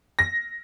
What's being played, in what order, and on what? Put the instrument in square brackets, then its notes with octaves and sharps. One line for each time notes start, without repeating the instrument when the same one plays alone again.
[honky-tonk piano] A#6